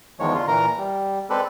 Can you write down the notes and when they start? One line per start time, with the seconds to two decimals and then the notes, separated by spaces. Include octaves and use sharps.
0.20 E2 D#3 F3 G#3 C#5
0.34 D3 F4
0.48 A#2 E3 A#4 A#5
0.78 G3
1.30 G#3 C4 A4 B4 D5